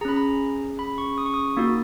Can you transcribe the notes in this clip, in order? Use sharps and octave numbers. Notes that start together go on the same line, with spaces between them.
C#4 G#4 A#5 B5
A#5
B5
C#6
D#6
C#6
D#6
A#3 D#4 F#4